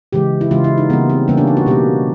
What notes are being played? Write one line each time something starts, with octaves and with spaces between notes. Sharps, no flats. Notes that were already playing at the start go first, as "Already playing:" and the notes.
C#3 E3 G#3 G4
E4
C#3 E3 G#3 F4
E4
D#4
C#3 E3 G3 A#3 B3
C4
C#3 E3 G3 A#3 C#4
D4
D#4
F#4
B2 G3 A#3 G4